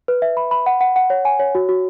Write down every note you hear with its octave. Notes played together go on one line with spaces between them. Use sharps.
B4
E5
B5
B5
F#5
F#5
F#5
C#5
G#5
C#5
F#4
F#4